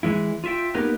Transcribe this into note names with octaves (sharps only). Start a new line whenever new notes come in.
E3 G#3 E4
F4 E5 G5
A#3 B3 D#4 G4 A#4 B4